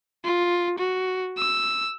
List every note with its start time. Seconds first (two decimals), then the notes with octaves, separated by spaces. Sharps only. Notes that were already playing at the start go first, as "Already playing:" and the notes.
0.24 F4
0.78 F#4
1.38 E6